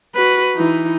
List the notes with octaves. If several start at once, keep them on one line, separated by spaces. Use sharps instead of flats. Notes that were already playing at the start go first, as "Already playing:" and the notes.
F#4 B4
E3 D#4